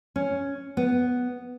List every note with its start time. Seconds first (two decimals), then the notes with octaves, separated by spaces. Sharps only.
0.16 C#4
0.77 B3